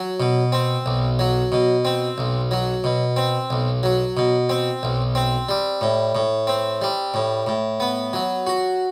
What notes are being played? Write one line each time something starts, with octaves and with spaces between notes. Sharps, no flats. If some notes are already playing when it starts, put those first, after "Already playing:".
Already playing: F#3
B2
C4
B1
F#3
B2
C4
B1
F#3
B2
C4
B1
F#3
B2
C4
B1
C4
G3
A2
A2
C4
G3
A2
A2
B3
F#3
F#4